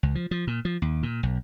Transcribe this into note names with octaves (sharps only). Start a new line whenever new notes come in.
C#2
F3
F3
A#2
F3
D#2
A#2
B1